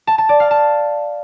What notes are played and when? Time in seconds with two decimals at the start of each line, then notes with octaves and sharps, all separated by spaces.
0.07 A5
0.18 A5
0.29 D5
0.40 F5
0.51 A5